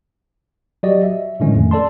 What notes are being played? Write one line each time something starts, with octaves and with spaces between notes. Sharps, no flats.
F#3 F#4 G4 D5 D#5
E5
A2 D3 D#3 F3 G#3 C#4
F2 A3
A4 D5 A5 C6